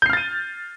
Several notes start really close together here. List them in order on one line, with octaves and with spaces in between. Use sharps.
G6 C7 F6 A6 D#7